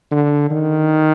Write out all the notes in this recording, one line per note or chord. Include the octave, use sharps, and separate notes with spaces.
D3
D#3